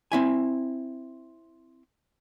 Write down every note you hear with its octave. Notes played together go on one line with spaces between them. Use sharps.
C4 E4 G#5